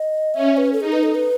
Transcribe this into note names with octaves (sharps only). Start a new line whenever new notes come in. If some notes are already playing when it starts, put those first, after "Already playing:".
Already playing: D#5
C#4 E5
B4
A4
D#4 G#4
B4
A4
B4